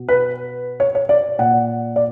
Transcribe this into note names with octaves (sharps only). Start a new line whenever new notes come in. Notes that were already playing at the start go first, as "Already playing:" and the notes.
Already playing: B2
B4
C#5
C#5
D5
A#2 F#5
D5